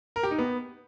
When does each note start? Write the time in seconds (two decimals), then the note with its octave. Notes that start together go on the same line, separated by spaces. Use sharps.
0.16 A#4
0.23 G4
0.31 D#4
0.39 B3